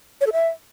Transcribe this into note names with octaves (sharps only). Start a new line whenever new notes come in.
C#5
A4
E5